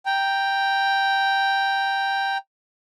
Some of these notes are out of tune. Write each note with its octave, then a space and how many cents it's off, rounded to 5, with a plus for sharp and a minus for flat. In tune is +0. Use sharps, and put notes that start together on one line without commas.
G5 +0 A#5 +0